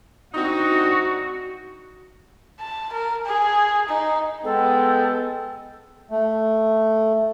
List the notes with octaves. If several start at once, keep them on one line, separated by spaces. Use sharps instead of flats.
C4 D4 D#4 F#4
A5
A#4
G#4
D#4
G#3 B3 A4 G5
A3